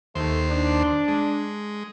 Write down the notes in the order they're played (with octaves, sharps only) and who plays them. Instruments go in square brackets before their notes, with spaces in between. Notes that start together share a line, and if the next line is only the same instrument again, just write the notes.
[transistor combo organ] D#2 C5 [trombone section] A3
[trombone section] D4
[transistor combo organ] G#3